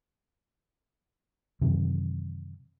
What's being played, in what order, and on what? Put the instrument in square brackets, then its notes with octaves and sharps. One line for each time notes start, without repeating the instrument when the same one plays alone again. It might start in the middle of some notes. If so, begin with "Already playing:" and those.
[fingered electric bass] F#2 C3 D#3 E3